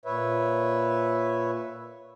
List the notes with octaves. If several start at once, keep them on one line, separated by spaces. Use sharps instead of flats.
A#2 B4 C#5 E5